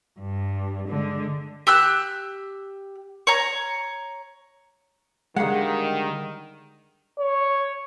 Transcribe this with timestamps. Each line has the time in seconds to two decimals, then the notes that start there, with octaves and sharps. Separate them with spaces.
0.20 G2
0.88 D3 G#3
1.67 G4 E6 F#6
3.27 C#5 A#5
5.36 D3 D#3 G3 G#3 G#4 F5 F#5
7.19 C#5